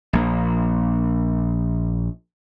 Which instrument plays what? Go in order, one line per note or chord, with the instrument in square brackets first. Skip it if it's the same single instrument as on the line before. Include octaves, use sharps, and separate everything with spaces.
[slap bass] A#1 A#3